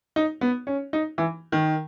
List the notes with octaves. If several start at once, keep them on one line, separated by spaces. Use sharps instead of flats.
D#4
B3
C#4
D#4
E3
D#3